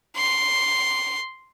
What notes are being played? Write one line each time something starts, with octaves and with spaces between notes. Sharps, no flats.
C6